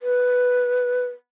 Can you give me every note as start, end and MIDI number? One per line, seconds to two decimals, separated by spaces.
0.01 1.04 71